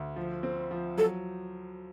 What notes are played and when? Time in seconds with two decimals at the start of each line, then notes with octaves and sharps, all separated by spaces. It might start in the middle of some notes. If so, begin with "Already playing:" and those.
Already playing: D2
0.16 F3
0.43 C4
0.71 F3
0.97 F#3 A4